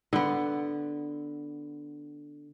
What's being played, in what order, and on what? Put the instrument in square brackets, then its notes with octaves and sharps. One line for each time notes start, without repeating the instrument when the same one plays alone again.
[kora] D3 B3